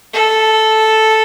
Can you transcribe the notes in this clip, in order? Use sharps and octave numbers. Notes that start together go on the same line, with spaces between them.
A4